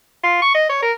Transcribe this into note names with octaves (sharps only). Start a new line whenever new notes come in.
F4
C#6
D#5
C#5
A#4